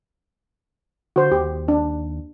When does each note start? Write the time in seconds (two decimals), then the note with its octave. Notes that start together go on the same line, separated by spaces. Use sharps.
1.16 D3 F#4 C5
1.31 D#2 G4
1.68 D4